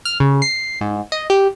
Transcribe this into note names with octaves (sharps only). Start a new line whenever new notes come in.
F6
C#3
C7
G#2
D#5
G4